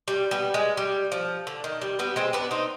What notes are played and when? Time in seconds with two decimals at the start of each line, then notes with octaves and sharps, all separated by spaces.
0.08 G3
0.31 G3 B3
0.54 G#3
0.77 G3
1.12 F3
1.47 D3
1.64 D#3
1.81 G3
1.99 G3 B3
2.16 G#3 C4
2.33 B3 D4
2.51 C4 D#4